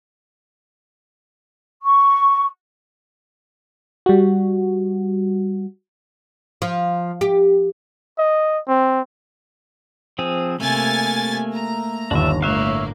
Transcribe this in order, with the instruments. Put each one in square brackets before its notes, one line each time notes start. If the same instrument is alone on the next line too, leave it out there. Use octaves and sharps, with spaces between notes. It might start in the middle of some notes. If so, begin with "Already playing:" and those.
[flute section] C#6
[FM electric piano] G3 F#4
[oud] F3
G4
[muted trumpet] D#5
C4
[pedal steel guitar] F3 C4 G#4
[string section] C3 G#5 A6 [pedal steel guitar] A3 A#3
[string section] A#5
[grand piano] G1 D#2 [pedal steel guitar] D4 E5
[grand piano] G1 F#6 [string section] A2 A#3 [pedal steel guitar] C#5 E5 F5